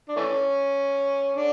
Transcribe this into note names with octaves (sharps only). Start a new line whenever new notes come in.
D4
E3 A3 C#4
D3 D4